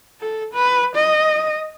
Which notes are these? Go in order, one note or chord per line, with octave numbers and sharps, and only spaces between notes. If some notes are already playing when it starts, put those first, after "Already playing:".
A4
B4
D#5